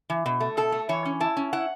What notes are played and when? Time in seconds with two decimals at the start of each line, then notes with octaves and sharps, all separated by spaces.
0.10 E3
0.26 B2
0.40 A3
0.57 B2 A4
0.72 A3
0.89 E3 C#5
1.05 C#4
1.20 E4 A5
1.37 C#4
1.53 E4 F#5